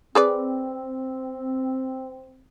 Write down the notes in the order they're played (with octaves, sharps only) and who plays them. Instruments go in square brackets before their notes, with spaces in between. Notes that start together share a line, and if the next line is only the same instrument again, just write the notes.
[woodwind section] C4 [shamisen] G#4 B4 D5